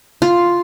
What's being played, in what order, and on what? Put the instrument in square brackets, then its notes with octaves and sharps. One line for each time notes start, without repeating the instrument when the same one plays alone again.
[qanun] F4